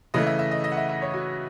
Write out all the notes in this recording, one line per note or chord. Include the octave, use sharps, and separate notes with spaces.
C#3 E3 A3 D#5
E5
E5
D#5
D#5
F#5
E5
E5
C#5
F#4